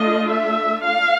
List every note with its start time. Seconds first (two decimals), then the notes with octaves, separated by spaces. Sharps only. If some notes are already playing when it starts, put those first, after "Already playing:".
Already playing: A3 D4 F4 D#5
0.30 E5
0.84 F5